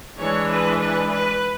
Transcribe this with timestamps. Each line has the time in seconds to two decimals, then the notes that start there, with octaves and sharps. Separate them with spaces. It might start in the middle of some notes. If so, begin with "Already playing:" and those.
0.19 E3 G#3 D4 C#5
0.50 B4
0.81 B4
1.11 B4